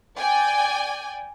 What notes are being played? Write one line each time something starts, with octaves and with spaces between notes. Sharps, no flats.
D5 G5 G#5